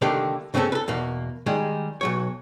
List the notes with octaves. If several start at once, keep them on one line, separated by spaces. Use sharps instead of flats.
C2 D3 D#3 A3 A#3 G4
G2 C#3 A3 C4 C#4 A4
A4 B4
E2 B2 A#3
D#3 G3 G#3
B1 F#3 C#5